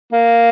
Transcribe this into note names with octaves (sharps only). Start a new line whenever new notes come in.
A#3